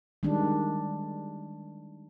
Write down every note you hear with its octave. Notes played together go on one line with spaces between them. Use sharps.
D#3 G3 G#3 D4